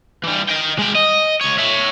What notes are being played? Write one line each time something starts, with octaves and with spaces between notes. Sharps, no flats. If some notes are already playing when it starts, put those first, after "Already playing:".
E3 G3
D#5 G5
G#3 G5
D#5
C#2 C#5
C#5 E5